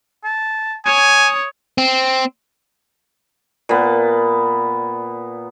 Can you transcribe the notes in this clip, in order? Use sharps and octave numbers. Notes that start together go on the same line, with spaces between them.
A5
C#5 G#5 D#6
C4
A#2 B3